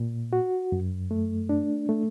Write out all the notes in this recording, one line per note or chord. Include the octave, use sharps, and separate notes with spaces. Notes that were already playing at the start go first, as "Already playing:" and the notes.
Already playing: A#2
F#4
F#2
A3
D4
A3